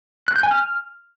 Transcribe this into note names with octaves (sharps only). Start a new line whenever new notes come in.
F#6
G6
G#5
F6